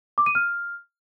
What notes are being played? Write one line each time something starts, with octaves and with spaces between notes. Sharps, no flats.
D6
D#7
F6